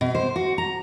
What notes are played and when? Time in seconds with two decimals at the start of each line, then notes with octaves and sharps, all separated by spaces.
0.01 B2
0.15 C5
0.36 F#4
0.58 A#5